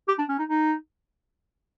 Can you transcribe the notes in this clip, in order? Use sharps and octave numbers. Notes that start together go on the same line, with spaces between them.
G4
D4
C#4
D#4
D#4